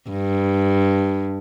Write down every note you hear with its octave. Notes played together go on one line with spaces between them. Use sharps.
G2